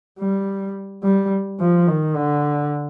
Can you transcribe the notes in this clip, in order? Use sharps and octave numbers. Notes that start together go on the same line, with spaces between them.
G3
G3
F3
D#3
D3